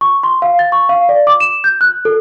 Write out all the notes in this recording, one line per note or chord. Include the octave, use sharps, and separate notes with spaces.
C#6
C6
F5
A6
C#6
F5
D5
D6
E7
G6
F#6
A4